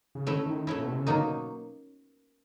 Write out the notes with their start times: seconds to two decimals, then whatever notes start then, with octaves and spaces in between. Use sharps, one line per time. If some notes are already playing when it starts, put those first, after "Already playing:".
0.15 C#3
0.27 D3 A3 C#4 E4
0.46 D#3
0.67 A3 C#4 E4
0.76 A#2
0.83 B2
0.91 C3
0.98 C#3
1.07 B2 D3 F#3 A#3 D#4